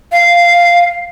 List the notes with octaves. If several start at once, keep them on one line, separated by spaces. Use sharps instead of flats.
F5